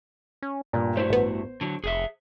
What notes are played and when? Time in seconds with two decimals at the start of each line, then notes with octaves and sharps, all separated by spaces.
0.42 C#4
0.73 G2 A#2
0.97 A3 E4 F#4 C5
1.10 A1 B3
1.61 D3 F#3
1.84 F1 G#4 E5